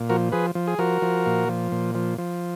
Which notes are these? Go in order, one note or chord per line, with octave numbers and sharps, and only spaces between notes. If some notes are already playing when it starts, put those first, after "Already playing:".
Already playing: A#2
F3 F#4 A#4
F3 G#4 B4
F3
G#4
F3 F#4 A#4
F3
A#2
F3
A#2
F3
F3